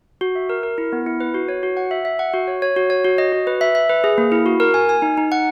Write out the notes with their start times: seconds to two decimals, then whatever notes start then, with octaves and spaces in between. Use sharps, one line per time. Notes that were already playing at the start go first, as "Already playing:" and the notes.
0.21 F#4
0.35 E5
0.49 A#4
0.63 A#4
0.78 E4
0.93 B3
1.06 E4
1.20 B4
1.34 F#4
1.48 C#5
1.63 F#4
1.77 F#5
1.91 E5
2.05 E5
2.19 F#5
2.33 F#4
2.47 C#5
2.62 C#5
2.76 F#4
2.90 C#5
3.05 F#4
3.18 D#5
3.32 F#4
3.47 B4
3.61 E5
3.75 E5
3.89 B4
4.04 G#4
4.18 A#3
4.32 E4
4.46 F#4
4.60 A#4
4.74 G#5
4.89 G#5
5.02 D#4
5.17 D#4
5.32 F#5